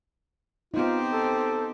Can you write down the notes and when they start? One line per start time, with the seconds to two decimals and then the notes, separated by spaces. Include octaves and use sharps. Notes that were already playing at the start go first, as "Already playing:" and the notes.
0.74 B3 C4 D#4 F4 G4 C5
1.13 A4